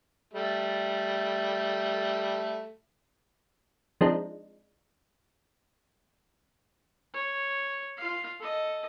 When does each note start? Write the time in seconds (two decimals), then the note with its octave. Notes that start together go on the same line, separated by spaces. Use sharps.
0.33 G3 A3
4.01 F3 G#3 C4 D4 D#4
7.14 C#5
7.97 F4 F5
8.40 A4 D#5